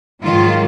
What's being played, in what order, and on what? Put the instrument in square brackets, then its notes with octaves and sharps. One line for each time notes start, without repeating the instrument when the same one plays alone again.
[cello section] G#2 D#3 F#3 F4